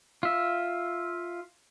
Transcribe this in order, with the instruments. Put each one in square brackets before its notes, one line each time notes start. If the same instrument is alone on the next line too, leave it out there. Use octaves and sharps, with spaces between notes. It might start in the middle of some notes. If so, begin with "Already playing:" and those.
[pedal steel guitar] F4 E5